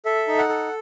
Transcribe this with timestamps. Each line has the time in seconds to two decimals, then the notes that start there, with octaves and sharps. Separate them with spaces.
0.05 A4 E5
0.28 D#4
0.39 F#5
0.49 A4